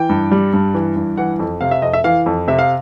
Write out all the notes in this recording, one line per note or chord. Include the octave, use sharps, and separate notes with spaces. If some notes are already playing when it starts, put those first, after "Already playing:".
Already playing: E3 G5
G2
G3
G2
E3
G2
E3 F#5
F2
C3 F5
E5
F2 D#5
E5
E3 F5
F2
C3 E5
F5